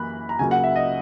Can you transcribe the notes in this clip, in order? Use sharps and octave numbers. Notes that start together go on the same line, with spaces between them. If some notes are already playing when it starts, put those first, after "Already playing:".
Already playing: F#2 E3 A#3 B5 F#6
A#5
C#2 C#3 F#3 A#3 G#5
F#5
E5
D#5